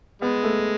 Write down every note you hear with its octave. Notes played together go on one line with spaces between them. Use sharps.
G#3 B3
A3